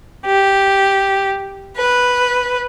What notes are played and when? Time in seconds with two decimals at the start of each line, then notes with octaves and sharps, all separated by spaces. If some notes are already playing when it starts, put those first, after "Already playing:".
0.25 G4
1.76 B4